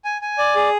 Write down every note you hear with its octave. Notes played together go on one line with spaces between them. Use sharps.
G#5
G#5
D5
G#4